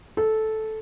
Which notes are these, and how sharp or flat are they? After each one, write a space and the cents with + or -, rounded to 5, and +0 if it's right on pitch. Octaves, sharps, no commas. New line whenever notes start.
A4 -10